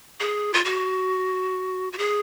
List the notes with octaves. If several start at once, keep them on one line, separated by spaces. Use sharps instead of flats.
G#4
F4
F#4
F#4
G#4